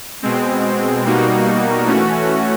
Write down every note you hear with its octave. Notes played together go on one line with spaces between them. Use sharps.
B2 G#3 C4
B2 G3 A#3 D#4 F#4
E3 A3 C#4 F#4